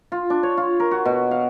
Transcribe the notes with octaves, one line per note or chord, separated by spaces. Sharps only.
F4
D4
C#5
F4
A#4
F#4
B2
F5